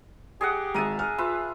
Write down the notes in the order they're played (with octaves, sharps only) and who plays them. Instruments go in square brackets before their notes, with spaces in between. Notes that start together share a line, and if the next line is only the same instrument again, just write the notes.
[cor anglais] G4 [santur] G#4 D#5 F#5
[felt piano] G#1 G#3 D#7 [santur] A#4 E5 A5
[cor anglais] G#4 [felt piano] F6
[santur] F4 B4 E5